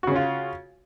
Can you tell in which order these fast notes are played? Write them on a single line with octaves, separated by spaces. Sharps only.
F#4 C#3 C#4 F4